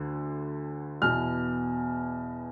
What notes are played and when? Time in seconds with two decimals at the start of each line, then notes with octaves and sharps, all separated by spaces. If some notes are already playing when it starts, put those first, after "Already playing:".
Already playing: D2 D3
1.02 E2 B2 F6